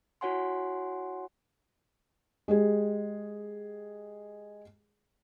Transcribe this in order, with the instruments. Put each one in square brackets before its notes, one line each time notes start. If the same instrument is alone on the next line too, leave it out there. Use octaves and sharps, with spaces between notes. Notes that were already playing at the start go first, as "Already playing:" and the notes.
[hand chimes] E4 F#4 C#5 F#5 G#5 C6
[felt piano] G#3 G4 G#4